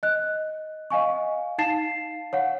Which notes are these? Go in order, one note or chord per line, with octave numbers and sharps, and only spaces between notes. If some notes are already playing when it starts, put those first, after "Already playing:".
D#5 F#6
D#5 F5 G#5 C#6
D#4 F5 A5 A6 C7 E7
C#5 F5 F#5